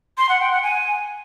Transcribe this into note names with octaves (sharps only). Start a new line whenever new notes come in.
C6
F#5
G5
F#5
G#5